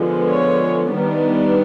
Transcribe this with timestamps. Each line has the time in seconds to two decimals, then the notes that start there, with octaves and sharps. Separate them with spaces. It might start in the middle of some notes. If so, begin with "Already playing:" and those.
Already playing: D3 F3 G#3 B3
0.29 C#5
0.93 D#3 G3 B3 D4